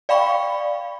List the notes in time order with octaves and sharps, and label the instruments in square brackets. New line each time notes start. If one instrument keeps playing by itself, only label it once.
[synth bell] D5 F5 G5 B5 C#6